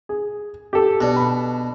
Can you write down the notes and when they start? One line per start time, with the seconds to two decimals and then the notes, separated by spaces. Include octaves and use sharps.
0.09 G#4
0.73 G4 A4
1.01 B2 D4
1.16 B5